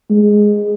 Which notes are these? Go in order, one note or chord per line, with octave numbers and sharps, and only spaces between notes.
G#3